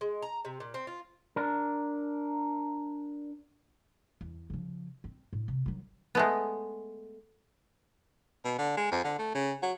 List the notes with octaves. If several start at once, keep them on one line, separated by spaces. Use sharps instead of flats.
G#3
A#5
C3
A#2
C4
F4
D4 A#4
E2
C#3 F3
C4
A2
C3
D#3 F#3
G#3 A3 B3
B2
D3
G#3
F2
D3
A3
C#3
F#3